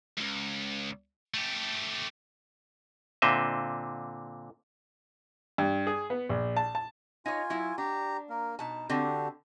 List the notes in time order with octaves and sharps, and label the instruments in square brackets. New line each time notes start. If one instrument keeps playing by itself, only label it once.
[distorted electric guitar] C#2 G#2
A3 G4
[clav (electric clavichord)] A#2 D3 C4 D#5 E5
[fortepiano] G2
G#4
B3
A#1
A5
A5
[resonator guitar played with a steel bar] D#4 C#5 [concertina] F4 G#5
[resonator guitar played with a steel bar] F#3 E4
[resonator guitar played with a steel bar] D4 [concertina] G4 A#5
[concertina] A#3 A#4
[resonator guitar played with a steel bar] B2 A5 [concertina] D#4
[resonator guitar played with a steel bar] D3 C4 [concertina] D4 F#4 G4